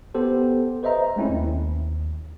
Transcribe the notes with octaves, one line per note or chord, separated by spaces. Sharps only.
B3 G4 A4 C5
B4 C5 D#5 E5 A#5
G#3 A3 C4 C#4 E4
D#2